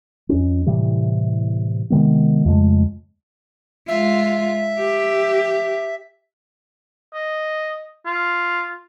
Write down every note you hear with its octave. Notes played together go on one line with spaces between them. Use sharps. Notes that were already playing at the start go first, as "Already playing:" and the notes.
F2 C#4
A2 C3 E3 G3
C3 D#3 G#3 B3
F2 C#3 G#3 A3
G#3 F4 E5
G4
D#5
F4